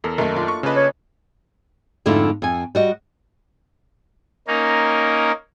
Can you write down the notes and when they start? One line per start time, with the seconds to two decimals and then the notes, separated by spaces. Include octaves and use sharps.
0.04 E2 A4 A#4
0.18 F#2 D#3 A3 A#3
0.36 D4 F4
0.48 C#6
0.63 C#3 C#4 D4 B4 D#5
0.76 C#5
2.06 F2 G#2 D3 A3 E4 F4
2.42 F2 G#5
2.75 G3 F#4 D#5
4.47 A#3 C#4 D#4 A#4